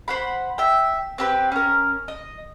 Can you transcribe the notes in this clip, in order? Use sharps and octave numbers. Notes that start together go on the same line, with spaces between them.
C5 F#5 B5
E5 G5
C4 G4 B4
C#4 A#4
D#5